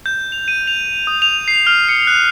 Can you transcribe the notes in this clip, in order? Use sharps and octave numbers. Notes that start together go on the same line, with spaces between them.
G6
F7
D#7
F7
D#6
F7
C7
F6
C#7
F#6